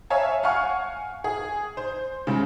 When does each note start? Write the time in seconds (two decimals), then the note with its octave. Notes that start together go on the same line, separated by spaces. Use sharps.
0.10 C#5 E5 F5 G#5 A5
0.43 F5 F#5 G#5 C#6 F6
1.24 G#4
1.77 C5
2.27 G#2 C#3